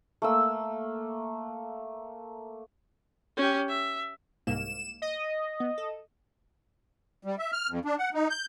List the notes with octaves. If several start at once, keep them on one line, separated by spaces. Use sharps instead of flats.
A3 A#3 E6
C#4 G4
E5
C2 G#2 A#3 E7
D#5
B3
A4
G3
E5
F6
F2
D4
F#5
D#4
G6